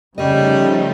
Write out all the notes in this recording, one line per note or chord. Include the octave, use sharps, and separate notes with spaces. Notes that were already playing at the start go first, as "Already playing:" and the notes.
C#3 F3 G3 A3 C#4 D#4 D#5